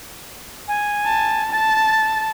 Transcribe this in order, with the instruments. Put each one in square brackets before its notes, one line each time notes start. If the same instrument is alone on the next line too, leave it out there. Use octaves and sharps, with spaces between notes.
[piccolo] G#5
[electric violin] A5
[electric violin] A5 [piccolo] A6